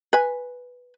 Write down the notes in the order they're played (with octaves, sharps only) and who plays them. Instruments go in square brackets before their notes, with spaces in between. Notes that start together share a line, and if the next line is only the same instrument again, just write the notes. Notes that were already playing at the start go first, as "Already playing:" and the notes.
[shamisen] B4 G#5